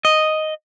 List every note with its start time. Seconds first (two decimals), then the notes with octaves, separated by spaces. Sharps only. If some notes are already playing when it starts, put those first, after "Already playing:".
0.05 D#5